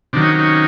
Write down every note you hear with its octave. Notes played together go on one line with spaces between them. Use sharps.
C3 D#3 F#3 D4
C#4 D#4
C#4 D#4